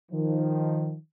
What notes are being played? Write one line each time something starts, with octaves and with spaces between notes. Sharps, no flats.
D#3 F3